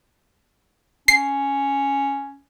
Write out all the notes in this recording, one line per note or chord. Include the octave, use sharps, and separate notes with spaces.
C#4 C7